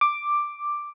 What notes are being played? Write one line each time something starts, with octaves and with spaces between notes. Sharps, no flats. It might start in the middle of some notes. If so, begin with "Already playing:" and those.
D6